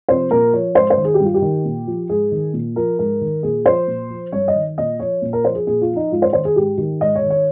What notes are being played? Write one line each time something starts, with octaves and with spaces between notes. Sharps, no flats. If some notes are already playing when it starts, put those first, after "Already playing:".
C3 F3 C5
A#2 A#4
F3 C#5
G#2 C5
C5
D#3
G#4
G4
G2 F4
G4
D#3
A#2
F3
G#2 G#4
D#3
A#2
F3 A#4
G#2 A#4
D#3
A#2 G#4
F3 C5
A#2
F3
G2 C#5
D#5
D#3
A#2 D#5
F3 C#5
A#2
A#4
F3 C5
G#4
A#2 G#4
F4
F3
D#4
G#2 F4
C5
D#3 C5
G#4
G#2 G4
D#3 G4
G#2 D#5
C#5
D#3
C#5